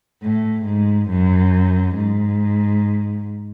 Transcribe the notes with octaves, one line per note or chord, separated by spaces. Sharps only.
A2
G#2
F#2
G#2